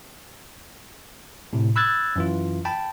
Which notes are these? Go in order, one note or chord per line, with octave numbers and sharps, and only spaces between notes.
A2 C3
B5 E6 F#6 G#6 A6
F#2 E3 F4
G5 A5 B5